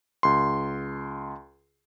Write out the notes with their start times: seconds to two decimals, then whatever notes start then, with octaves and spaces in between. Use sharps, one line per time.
0.23 C#2 C6